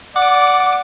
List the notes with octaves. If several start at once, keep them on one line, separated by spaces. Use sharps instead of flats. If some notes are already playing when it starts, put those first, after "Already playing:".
D5 F#5 D6